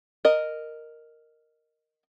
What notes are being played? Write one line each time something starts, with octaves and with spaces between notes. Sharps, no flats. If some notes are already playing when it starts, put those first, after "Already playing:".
A#4 D#5